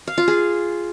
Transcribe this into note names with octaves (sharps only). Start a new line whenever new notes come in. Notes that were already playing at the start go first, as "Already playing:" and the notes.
F5
F4
G#4